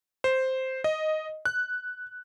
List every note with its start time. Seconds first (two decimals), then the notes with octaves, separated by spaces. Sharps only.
0.24 C5
0.84 D#5
1.45 F#6